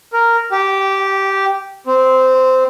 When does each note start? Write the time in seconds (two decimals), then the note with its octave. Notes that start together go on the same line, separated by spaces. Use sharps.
0.13 A#4
0.52 G4
1.87 C4